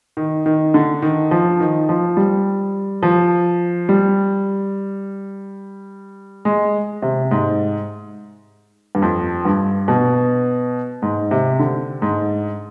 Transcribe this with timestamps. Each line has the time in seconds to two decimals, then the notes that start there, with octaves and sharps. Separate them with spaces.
0.17 D#3
0.46 D#3
0.74 D3
1.02 D#3
1.31 F3
1.60 D#3
1.89 F3
2.17 G3
3.03 F3
3.89 G3
6.45 G#3
7.02 C3
7.31 G#2
8.95 G2
9.02 F2
9.45 G2
9.88 B2
11.02 G#2
11.31 C3
11.59 D3
12.02 G#2